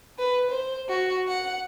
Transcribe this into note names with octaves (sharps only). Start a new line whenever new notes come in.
B4
C5
F#4
F#5